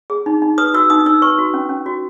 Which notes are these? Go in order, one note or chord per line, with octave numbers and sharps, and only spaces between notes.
G#4
D#4
D#4
B4 D#6
F#4 E6
D#4 D#6
D#4 E6
B4 C#6
F#4
C#4
C#4
F#4